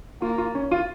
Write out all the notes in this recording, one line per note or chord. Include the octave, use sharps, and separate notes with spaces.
A#3 F4
F4
C#4
F4